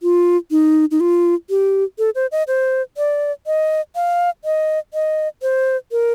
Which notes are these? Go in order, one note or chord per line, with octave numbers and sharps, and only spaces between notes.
F4
D#4
D#4
F4
G4
A4
C5
D#5
C5
D5
D#5
F5
D#5
D#5
C5
A#4